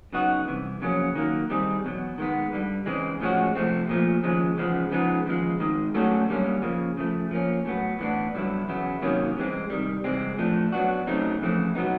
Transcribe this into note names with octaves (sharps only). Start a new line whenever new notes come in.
C#3 F#3 B3 D#4 F#4
C2 C3 E3
F2 C#3 F#3 A#3 C#4
D#3 F#3 A#3
D#3 G3 C4 D#4 G#4
E2 B2 F#3
D#3 G#3 B3
G2 D3 G3
C#3 E3 G#3 C4
A2 F3 G#3 C#4 F#4
C3 F3 A3 C4
A#2 F3 A3
D#2 C#3 F3 G#3
E2 C#3 F3 G#3 B3
C#3 F3 G#3 B3 D#4
D#2 C#3 F3 G#3
G#2 D#3 G#3
F#3 A3 C#4 F#4 A4
F#2 D3 G3 A#3 C#4
C#3 F3 A#3
C#3 F3 A3
F3 A#3 C#4
A2 F#3 B3
A2 E3 G3 B3 D4
G2 D3 F#3 B3 E4
E2 C#3 F#3 B3 E4
C3 D#3 F#3 A#3 C#4
C2 C3 E3 G#3 C4
C3 D#3 G3
C2 C3 E3 G#3 C4
A2 F3 A3 D4
F#3 B3 D4 F#4
C#3 F#3 A3 C4 D#4
F2 C#3 E3 A3 C4
B2 F#3 B3 D#4